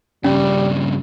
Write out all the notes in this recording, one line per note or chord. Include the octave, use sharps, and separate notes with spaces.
G2 C#3 G3 C#4